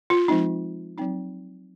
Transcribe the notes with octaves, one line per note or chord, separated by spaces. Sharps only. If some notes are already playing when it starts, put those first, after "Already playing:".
F4
F3 G#3 C4 D#4
F#3 C4 D#4